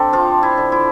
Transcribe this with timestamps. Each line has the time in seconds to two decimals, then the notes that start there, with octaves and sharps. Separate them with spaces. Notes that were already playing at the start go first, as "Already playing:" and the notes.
Already playing: D3 C4 G4 A4
0.12 F3 F4
0.43 E4
0.57 D3
0.72 E4